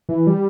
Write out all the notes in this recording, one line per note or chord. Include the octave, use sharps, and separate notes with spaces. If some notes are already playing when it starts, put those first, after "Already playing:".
E3
G3